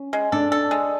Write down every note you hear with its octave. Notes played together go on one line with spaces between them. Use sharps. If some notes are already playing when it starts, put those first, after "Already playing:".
Already playing: C#4
G#3
D4 A4
A4
G#3